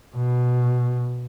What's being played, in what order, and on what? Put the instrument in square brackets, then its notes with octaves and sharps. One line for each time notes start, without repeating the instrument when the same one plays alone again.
[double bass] B2